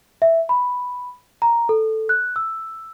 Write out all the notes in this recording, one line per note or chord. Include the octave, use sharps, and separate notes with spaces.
E5
B5
A#5
A4
F#6
E6